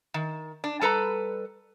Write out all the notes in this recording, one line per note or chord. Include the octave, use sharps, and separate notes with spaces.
D#3
D4
G3 A4 B4 A#5